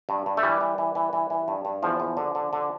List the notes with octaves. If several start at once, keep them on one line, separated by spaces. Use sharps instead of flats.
G2
G2
A3
E3 G3
E3
E3
E3
E3
E3
G2
G2
E2 F3
E2
D3
D3
D3